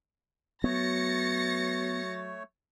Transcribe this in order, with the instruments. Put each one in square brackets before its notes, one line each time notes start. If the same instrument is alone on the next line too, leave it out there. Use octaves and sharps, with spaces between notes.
[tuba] F#3 [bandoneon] A3 C#5 [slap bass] B3 [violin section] A6 A#6 C#7